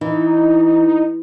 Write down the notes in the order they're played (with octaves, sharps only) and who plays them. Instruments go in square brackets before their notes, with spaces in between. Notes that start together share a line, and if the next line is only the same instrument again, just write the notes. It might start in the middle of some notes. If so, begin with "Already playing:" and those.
[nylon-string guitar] E3 [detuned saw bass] D#4